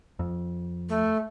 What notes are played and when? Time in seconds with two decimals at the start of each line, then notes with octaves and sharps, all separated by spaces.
0.19 F2
0.89 A3